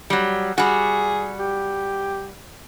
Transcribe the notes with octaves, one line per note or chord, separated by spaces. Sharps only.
F#3 G3
G3 F#4 G#4
G4